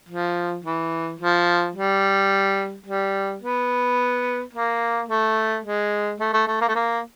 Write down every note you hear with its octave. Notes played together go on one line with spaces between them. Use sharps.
F3
E3
F3
G3
G3
B3
A#3
A3
G#3
A3
A3
A3
A#3
A3
A#3